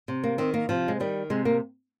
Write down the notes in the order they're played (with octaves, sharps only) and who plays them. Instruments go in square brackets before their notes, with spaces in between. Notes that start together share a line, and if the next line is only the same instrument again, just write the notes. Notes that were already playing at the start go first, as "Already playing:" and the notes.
[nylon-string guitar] C3
A#3
D#3 C4
A#3
C3 F3
G#3
D#3 G3
C3 G#3
A#3